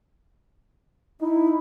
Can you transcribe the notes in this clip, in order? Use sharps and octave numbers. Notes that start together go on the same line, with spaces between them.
D#4 E4